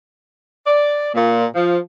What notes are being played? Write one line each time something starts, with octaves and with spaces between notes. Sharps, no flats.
D5
A#2
F3